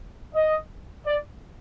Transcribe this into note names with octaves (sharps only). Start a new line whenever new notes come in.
D#5
D5